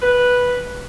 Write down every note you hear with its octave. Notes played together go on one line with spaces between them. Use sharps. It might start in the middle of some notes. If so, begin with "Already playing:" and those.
B4